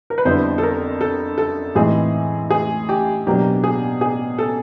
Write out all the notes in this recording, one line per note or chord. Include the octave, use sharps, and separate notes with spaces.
A#4
B4
F2 D3 G3 B3 E4 C5
A4
A#4
A4
A4
A2 E3 G#3 C4 D#4 G#4
G#4
G4
B2 F#3 A#3 D4 G4
G#4
G#4
A4